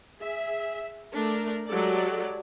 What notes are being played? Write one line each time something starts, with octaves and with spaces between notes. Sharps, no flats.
G#4 E5
A3 D4 A#4
F#3 G#3 G4 A4 D5